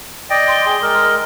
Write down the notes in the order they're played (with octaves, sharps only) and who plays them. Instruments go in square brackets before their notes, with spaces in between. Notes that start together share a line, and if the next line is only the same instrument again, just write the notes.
[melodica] D5 D#5 G5
[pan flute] C6
[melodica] G#4
G#3 A#4